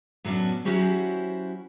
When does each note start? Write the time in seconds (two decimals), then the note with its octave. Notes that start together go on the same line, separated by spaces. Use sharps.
0.25 A2 F#3 B3 C#4 D4
0.65 F#3 C#4 E4 F#4 G4 C5